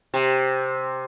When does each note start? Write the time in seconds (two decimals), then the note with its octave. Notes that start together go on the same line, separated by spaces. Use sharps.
0.14 C3